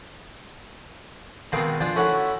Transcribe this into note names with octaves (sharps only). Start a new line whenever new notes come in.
B2 D#3 G#3 C4 G#4 F5
D4 F4 G#4 C5
A3 C#4 E4 F#4 C#5 F#5